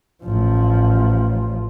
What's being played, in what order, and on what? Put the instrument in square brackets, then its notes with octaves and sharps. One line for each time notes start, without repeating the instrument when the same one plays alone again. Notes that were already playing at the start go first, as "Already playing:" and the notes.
[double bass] A1 F3